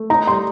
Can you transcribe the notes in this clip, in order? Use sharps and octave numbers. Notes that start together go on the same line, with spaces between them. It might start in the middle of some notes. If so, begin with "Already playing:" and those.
Already playing: A3
D#4 A#5
G3 C6